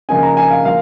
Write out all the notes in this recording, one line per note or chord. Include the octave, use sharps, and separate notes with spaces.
C#3 F3 A#3 D#4 G#5
A#5
G#5
F5
F3 A#3 F5